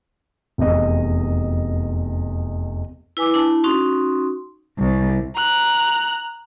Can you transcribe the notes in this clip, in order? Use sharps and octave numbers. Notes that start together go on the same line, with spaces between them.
F1 E2 D#5
E4 B4 G#5 D6 E6
D4 E4 A5
C#4 D#4 F#4 C6
C2
A#5 F#6